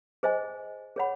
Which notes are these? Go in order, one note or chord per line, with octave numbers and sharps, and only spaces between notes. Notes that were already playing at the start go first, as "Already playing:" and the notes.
G#4 C5 D#5 G#5
G#4 C#5 F#5 B5